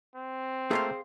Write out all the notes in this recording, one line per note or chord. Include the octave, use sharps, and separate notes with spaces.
C4
A3 A#3 F4 G#4 C5 F5